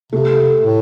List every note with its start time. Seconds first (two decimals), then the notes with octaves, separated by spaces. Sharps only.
0.12 C3 A3
0.60 A2